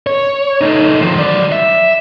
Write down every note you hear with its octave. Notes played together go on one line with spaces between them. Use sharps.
C#5
A3 D#4
D#3 F3
F#3 D5
E5